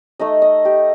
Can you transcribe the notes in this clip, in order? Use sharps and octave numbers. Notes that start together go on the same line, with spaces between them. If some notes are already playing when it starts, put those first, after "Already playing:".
A3 D#4 D#5
D#5
G4